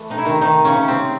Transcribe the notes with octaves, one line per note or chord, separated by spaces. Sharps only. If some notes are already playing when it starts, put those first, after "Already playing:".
Already playing: E3 A3
C3 D#4
E4
D#3 D#4
C3 D#3 D#4
C#3 C#4
C3
C4